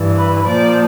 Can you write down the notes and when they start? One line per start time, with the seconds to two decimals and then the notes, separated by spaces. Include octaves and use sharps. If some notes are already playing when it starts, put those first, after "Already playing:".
Already playing: G2 E3
0.18 B4
0.47 A#2 F3 D5